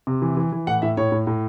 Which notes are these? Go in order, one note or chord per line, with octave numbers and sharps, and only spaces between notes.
C3
E3
E3
E3
A2 F#5
A2 E5
A2 C#5
A2
A2